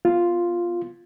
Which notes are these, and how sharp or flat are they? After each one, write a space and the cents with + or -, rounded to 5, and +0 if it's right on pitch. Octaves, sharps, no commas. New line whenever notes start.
B3 +0 F4 +0